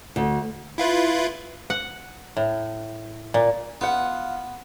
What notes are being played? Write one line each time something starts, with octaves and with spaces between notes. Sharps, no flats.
D2
E4 F4 B4
F#5
A2
A#2
B3 F4 F#5